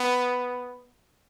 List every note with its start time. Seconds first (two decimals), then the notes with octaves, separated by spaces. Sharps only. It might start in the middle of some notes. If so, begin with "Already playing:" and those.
Already playing: B3